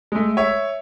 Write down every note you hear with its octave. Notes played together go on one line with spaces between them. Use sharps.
G#3 A3
C#5 E5